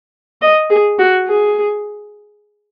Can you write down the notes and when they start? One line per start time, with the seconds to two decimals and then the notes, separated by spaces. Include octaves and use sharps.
0.42 D#5
0.70 G#4
0.99 F#4
1.27 G#4